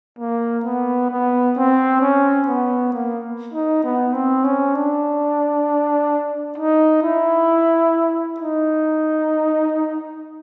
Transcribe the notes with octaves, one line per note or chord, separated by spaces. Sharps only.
A#3
B3
B3
C4
C#4
B3
A#3
D#4
B3
C4
C#4
D4
D#4
E4
D#4